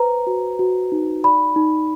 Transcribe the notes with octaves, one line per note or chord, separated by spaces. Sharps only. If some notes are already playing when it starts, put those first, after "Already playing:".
Already playing: B4 C5 A#5
F#4
F#4
D#4
D5 B5
D#4